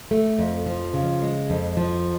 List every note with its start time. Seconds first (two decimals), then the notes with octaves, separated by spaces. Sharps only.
0.11 A3
0.39 F2
0.66 F3
0.93 C#3
1.22 G#3
1.50 F2
1.77 F3